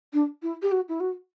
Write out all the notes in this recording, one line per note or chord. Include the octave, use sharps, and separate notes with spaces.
D4
E4
G4
F#4
E4
F#4